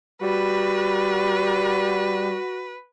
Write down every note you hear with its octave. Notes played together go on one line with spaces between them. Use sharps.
G3 F#4 B4